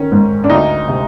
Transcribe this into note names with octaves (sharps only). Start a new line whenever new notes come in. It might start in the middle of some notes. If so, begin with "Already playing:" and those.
Already playing: D#3 C#4
G#2
D4
D2 D#4
C3